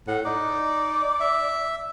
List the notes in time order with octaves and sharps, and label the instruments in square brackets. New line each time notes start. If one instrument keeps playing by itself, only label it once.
[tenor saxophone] A2 [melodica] F#5
[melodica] D#4 [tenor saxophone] D5
[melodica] E5